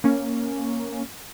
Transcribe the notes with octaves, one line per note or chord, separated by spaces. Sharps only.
A#3 C#4